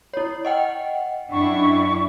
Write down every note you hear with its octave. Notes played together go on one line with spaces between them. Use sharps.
E4 C#5
D#5 F#5 G5
F#2 D4 E4 C#6